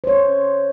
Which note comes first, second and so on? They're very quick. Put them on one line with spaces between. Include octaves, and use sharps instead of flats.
C5 C#5 C#4